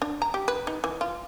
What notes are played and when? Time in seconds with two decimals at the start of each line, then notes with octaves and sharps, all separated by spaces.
0.02 D4
0.22 A#5
0.34 G4
0.48 B4
0.67 D#4
0.84 E3
1.01 F4